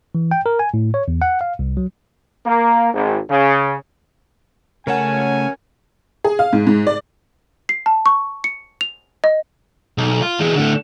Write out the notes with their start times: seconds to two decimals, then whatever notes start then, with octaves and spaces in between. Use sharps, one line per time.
0.15 E3
0.31 G5
0.46 A#4
0.59 G#5
0.74 A2
0.94 C#5
1.08 E2
1.22 F#5
1.41 F5
1.59 C2
1.77 F#3
2.46 A#3
2.94 G#1
3.29 C#3
4.87 C#3 A3 C#4 A#4 C#5 F#5 G#5 A5
6.24 G#4
6.39 F5
6.53 G#2
6.67 G#2
6.87 D5
7.69 C7
7.86 A5
8.06 C#6
8.44 C#7
8.81 F7
9.24 D#5
9.98 B1
10.22 F4
10.39 E3 G#3
10.56 A2 D3